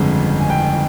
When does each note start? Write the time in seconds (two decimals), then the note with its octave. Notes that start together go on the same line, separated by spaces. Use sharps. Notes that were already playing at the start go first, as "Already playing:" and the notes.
Already playing: G1 F2 C#3 G#3 C#4
0.40 G#5
0.50 G5